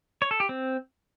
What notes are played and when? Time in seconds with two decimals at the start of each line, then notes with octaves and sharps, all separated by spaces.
0.22 C#5
0.31 A4
0.40 G4
0.49 C4